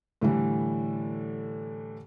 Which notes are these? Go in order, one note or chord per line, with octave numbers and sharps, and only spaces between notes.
A2 D3 E3 G3